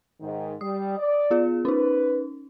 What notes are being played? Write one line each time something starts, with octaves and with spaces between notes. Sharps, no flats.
G#2 D#3
G3 D#6
D5
B3 F4 G#4
C#4 D#4 B4